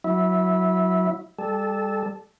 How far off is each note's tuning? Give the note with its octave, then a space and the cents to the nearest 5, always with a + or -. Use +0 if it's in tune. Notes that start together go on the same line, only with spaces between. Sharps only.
F#3 -10 E4 -15
G3 +25 A4 -15